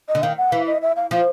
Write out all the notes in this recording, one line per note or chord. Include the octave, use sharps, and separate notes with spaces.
D#5
D3
D#3 F5
F#5
E3 F5
D#5
E5
F5
F3 F5